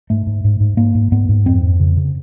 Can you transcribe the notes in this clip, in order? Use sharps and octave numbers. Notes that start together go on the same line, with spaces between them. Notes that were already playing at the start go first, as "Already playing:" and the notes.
G#2 A3
G#2
G#2
G#2
G#2 A#3
G#2
G#2 B3
G#2
F2 C4
F2
C#3
C#3